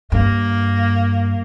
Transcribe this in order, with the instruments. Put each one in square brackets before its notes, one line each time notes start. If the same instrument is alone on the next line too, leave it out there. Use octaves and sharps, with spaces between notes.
[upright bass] G2 [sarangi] A#3